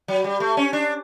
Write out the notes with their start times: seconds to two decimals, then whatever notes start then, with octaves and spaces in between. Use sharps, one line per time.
0.08 F#3
0.24 G3
0.40 A3
0.57 C#4
0.73 D4